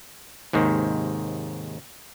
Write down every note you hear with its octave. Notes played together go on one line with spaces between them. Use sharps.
D#2 G#2 C3 D#3